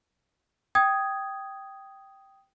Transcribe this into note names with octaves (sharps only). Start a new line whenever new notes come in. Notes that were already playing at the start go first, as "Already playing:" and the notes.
G5 D#6 G#6